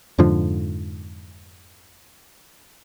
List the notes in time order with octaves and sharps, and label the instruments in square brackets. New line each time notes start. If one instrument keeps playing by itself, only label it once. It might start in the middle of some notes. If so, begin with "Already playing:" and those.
[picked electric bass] F2 G#2 D3 F3